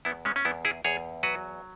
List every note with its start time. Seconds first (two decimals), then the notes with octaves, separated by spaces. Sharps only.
0.05 E2 B3 E4
0.25 G#3 C#4
0.36 C#4
0.45 E2 B3 E4
0.65 E4 G#4
0.85 E2 G#4 C#5
1.23 F#3 F#4 B4